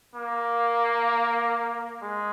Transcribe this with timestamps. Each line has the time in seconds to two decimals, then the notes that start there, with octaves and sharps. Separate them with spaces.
0.15 A#3
2.02 G#3